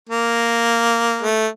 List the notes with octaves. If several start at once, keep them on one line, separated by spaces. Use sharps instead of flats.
A#3
A3